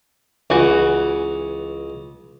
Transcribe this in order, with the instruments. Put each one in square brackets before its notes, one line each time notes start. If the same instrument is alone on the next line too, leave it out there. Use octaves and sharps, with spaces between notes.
[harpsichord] C#2 [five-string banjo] E3 F#4